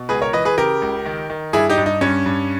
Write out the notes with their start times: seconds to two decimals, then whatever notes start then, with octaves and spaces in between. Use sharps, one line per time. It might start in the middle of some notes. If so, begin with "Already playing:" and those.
Already playing: B2
0.09 C#2 G#4 B4
0.22 A#4 C#5
0.33 E3 B4 D#5
0.45 G#4 B4
0.58 C#3 G4 A#4
0.82 C#2
1.06 D#3
1.30 D#3
1.53 G2 E4 G#4
1.70 D#4 G4
1.78 G2
1.86 D#4
2.01 G2 C#4
2.26 G2